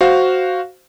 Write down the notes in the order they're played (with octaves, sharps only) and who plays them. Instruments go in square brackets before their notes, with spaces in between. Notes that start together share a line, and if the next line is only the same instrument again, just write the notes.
[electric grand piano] F#4 C5 F5